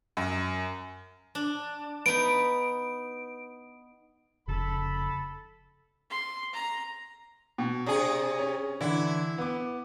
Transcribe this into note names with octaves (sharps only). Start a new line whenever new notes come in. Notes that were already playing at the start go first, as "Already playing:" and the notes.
F#2
D4
B3 D#4 D7
F1 C#3 A4 B5
C6
A#5
B2
C3 D4 G#4
C#4
D3 E3 E4
B3 D6